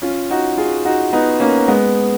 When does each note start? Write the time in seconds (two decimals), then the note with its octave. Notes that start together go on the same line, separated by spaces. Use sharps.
0.02 C#4 F4
0.31 D#4 F#4
0.58 F4 G#4
0.85 D#4 F#4
1.13 B3 D#4
1.40 A#3 C#4
1.68 G#3 B3